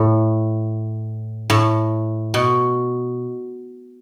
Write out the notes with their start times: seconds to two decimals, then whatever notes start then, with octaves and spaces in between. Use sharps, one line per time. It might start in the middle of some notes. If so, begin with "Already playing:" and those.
Already playing: A2
1.50 A2
2.34 B2